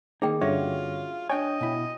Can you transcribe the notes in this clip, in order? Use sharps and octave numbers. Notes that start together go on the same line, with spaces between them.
D#3 A#3 D#4 G#4 G5
G2 D3 C#4 F4 F#4 C#5 E5
D4 C#5 D#5 G5 G#5
B2 E4